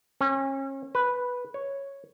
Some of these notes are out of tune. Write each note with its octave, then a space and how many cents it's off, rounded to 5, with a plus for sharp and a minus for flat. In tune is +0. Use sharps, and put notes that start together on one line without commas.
C#4 -35
B4 -5
C#5 -5